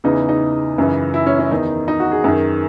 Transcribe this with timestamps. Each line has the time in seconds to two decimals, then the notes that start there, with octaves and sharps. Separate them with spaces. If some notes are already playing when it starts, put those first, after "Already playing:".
0.04 E2 C#3 E3 D#4
0.29 D#4
0.78 F#2 C#3 E3
1.14 E4
1.26 C#4
1.39 C#4
1.51 E2 D#3 D#4
1.88 D#4
2.00 F#4
2.12 G#4
2.24 F#2 D#3